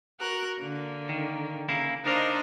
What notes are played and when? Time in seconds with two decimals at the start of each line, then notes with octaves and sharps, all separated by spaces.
0.20 F#4 A#4 F#6
0.58 D3 A#3
1.09 D#3
1.69 C#3 A#3 E4
2.06 D4 D#4 A#4 C5 D#5 F5